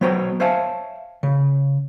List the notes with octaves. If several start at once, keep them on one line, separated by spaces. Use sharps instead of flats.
F#3 B3 C5 C#5 G5 A#5
C5 C#5 E5 F5 G#5 A5
C#3